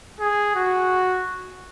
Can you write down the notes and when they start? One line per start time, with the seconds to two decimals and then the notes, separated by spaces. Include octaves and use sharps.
0.20 G#4
0.56 F#4